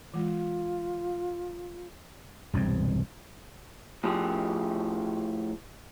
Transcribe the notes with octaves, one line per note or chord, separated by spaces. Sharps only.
E3 G#3 F4
E1 C2 G2 C4
A2 F3 G4 G#4